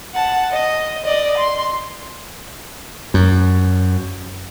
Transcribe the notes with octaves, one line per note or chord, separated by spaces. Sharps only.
F#5 A5
D#5
D5 D#5
C6
F#2